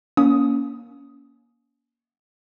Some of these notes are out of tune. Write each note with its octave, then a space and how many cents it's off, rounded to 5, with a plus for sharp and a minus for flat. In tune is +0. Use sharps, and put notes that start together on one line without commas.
A#3 +20 C#4 +25 D#6 +10